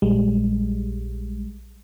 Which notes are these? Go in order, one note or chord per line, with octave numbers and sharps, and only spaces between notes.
A#1 G3 G#3